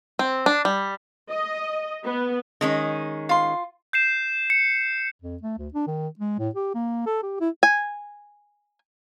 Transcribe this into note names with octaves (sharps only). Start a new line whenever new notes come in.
C4
D4
G3
D#5
B3
D#3 G#3 C#4
F4 C6
G6 C7 E7
C#7
F2
A3
D2
D4
D#3
G#3
A2
G4
A#3
A4
G4
E4
G#5